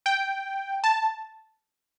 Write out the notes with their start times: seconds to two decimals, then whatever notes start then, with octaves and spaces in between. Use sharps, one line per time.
0.06 G5
0.84 A5